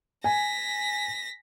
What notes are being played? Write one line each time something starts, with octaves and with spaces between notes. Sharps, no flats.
G#5 A#6 B6